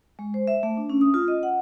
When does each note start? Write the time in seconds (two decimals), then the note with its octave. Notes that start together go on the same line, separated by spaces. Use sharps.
0.19 G#3
0.34 C5
0.47 E5
0.63 A3
0.77 D4
0.90 C#4
1.01 D#6
1.14 F4
1.28 D#5
1.43 F#5